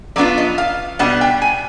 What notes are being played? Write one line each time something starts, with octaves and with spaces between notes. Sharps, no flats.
F#3 B3 D4 F4 D5
D#5
F5
B2 G3 B3 D4 F#5
G5
G#5